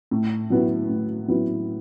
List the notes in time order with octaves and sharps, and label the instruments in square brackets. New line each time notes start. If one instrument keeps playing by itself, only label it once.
[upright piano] A2
F#3 B3 E4
A2
F#3 B3 E4